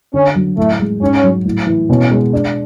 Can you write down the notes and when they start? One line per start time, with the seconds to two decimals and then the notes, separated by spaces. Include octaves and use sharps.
0.14 D3 C#4
0.35 F#3
0.57 A2 A3
0.80 G#3
1.01 G#2 C#4
1.24 F#3
1.45 A2
1.67 E3
1.89 B2 C#4
2.11 G#3
2.33 D4